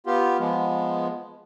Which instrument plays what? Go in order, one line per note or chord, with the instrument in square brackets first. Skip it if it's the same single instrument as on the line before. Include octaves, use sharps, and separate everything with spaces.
[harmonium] B3 F4 G4
F3 G#3 B3